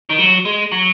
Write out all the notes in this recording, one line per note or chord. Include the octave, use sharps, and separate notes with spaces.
D#3
F#3
G#3
F#3